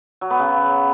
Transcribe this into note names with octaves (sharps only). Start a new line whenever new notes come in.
F#3
B3
C#3